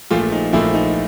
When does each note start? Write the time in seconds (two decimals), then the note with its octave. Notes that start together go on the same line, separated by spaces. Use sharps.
0.11 A#1 A#2 F3 A3 F4
0.32 D#4
0.52 A#1 A#2 F3 A3 E4
0.74 D#4